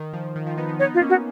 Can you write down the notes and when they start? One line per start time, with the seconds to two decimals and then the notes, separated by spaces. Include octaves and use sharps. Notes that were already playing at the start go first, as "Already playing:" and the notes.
Already playing: D#3
0.13 F3
0.36 D#3
0.46 F3
0.57 B3 D#4
0.69 B3 D#4
0.79 B3 D#4 C#5
0.94 F4
1.02 A#3 C#4
1.09 F#4